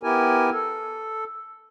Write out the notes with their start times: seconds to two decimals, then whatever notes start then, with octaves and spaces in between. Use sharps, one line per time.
0.03 B3 E4 G4 A#4 G#5
0.52 A4